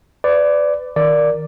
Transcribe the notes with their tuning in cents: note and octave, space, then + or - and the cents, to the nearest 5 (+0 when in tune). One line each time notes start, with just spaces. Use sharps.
B4 +30 D5 +0
D#3 +0 A#4 +0 D5 +0